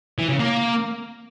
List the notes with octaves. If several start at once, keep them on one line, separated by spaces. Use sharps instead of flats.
E3
C#3
A#3